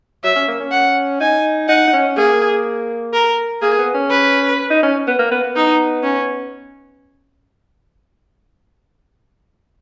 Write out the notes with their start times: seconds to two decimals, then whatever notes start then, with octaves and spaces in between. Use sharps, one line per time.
0.24 F#3 E5
0.36 C#4
0.48 A#3
0.60 C#4
0.72 F#5
1.20 D#4 G#5
1.68 D#4 F#5
1.87 D#4
1.93 C#4
2.17 A#3 G#4
3.13 A#4
3.62 A#3 G#4
3.78 B3
3.94 C#4
4.11 B4
4.70 D#4
4.83 C#4
5.07 B3
5.19 A#3
5.31 B3
5.43 B3
5.56 D#4
6.03 C#4